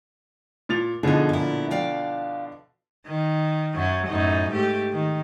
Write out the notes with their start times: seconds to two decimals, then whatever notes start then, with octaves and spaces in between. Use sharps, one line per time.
0.69 A#2 A6 F7
1.03 B2 D3 F3 D#4 G#4
1.29 A#2 E4
1.71 D5 F5 G5
3.06 D#3
3.75 F#2 F#3
4.07 F#2 A2 D#4
4.52 G#2 A3 G4
4.92 D#3